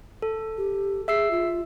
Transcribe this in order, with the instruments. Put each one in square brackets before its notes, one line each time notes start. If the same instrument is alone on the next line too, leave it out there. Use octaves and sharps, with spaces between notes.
[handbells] A4
[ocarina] G4
[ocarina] G#4 [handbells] E5 E6 C7
[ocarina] F4